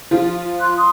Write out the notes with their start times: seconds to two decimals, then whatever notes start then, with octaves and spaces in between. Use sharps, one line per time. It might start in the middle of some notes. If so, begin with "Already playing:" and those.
0.11 F3 F4
0.60 C6 F#6
0.77 C6 D#6